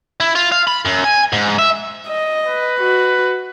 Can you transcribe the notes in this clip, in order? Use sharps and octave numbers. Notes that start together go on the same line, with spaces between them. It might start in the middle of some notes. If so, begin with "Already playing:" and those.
E4
F4
F5
B5
F#2
G#5
G#2
E5
D#5
B4
F#4